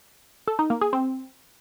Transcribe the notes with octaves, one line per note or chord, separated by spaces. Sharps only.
A4
D#4
A#3
G#4
C4